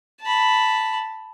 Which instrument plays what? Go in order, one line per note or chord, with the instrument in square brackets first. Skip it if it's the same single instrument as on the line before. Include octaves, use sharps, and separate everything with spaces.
[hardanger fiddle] A5 B5